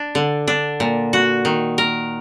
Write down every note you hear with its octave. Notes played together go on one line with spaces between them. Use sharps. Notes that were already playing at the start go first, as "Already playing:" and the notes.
Already playing: D4
D3
D4
A#2
F#4
D#3
A#4